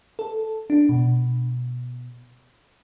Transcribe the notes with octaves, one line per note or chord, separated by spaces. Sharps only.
A4
D4
B2